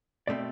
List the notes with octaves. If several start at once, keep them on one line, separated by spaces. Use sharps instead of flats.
B2 A3 C4 D5